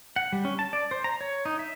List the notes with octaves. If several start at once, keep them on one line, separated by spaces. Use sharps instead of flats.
F#5
G3
C#4
A5
D5
C5
A#5
C#5
D#4
E5